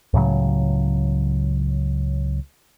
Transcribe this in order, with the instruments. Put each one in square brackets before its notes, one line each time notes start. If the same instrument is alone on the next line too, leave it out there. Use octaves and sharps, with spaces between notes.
[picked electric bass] C#2 A2 C#3 F#3